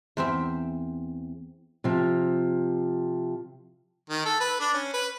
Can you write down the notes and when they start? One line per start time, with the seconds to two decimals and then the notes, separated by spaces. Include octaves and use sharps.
0.17 E2 C4 C5 E5
1.84 C3 F3
4.10 D#3
4.25 A4
4.41 B4
4.60 D4
4.74 C#4
4.94 B4